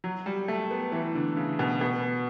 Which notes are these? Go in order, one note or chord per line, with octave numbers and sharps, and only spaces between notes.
F#3
G3
A3
B3
E3
D3
C#3
B2
B2